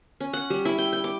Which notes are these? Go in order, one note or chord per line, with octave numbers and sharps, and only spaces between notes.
C#4
F#5
G3
E4
G5
G5
D6